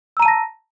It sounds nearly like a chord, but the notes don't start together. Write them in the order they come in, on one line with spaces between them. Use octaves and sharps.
E6 A#5 D#7 A5 A#6